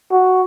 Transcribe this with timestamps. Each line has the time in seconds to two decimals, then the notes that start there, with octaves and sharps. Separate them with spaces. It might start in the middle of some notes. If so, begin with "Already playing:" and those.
0.12 F#4